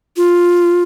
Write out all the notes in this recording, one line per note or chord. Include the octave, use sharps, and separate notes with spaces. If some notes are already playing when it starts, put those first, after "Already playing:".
F4